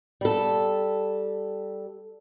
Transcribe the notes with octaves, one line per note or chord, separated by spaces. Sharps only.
G3 A4